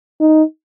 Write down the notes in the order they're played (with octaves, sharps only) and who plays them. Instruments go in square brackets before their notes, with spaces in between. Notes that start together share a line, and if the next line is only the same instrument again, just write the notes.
[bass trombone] D#4